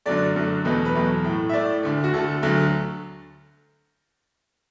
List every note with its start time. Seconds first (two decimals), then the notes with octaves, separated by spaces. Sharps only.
0.06 F#2 D3 F#3 A3 D5
0.36 F#2 D3 F#3 A3
0.65 E2 B2 F#3 A3 B4
0.85 B4
0.95 E2 B2 F#3 A3
1.24 A2 A3
1.49 E5
1.54 A2 A3 D5
1.83 D2 D3 A3
2.04 F#4
2.13 D2 D3 A3 A4
2.42 D2 D3 F#3 A3